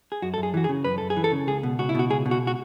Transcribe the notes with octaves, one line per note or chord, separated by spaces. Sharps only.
G#4
F#2 F#4
A4
F#2
G#4
E3 F#4
G#4
C#3
F#2 B4
F#2 A4
G#4
E3
A4
C#3
C#2 G#4
B2
C#2 F#4
E4
B2 F#4
C#2 G#4
B2
F#4
F#4